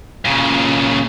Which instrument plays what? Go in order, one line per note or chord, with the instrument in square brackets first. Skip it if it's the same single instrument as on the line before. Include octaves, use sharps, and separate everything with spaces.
[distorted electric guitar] A#2 C#3